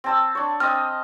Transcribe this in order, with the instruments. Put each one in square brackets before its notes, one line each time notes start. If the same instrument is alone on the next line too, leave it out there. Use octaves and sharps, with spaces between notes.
[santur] C4 A5 E6
D4 C#5
[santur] C4 D#5 [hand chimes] F6